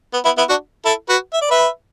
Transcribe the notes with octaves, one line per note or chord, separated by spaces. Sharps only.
B3
B3 E4
B3 E4
D4 F#4
E4 A4
F#4 B4
E5
D5
B4 E5